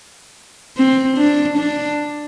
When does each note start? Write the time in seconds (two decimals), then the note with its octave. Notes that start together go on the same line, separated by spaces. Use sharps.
0.77 C4
1.17 D4
1.58 D4